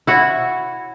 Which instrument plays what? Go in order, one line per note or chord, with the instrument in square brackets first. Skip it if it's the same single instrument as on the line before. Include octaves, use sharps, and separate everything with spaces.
[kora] E4 F#4 C#5